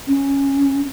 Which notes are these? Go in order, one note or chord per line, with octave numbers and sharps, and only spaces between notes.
C#4